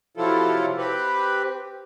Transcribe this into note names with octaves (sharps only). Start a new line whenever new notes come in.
C3 F3 F#3 E4 F4 A4
C4 G4 B4